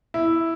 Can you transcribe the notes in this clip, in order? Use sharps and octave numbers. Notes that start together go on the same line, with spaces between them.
E4